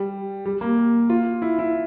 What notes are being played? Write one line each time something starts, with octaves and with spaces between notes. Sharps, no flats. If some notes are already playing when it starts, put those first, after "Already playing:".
Already playing: G3
G3
A#3
F4
E4
E4